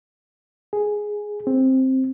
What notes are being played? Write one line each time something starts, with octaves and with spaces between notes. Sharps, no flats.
G#4
C4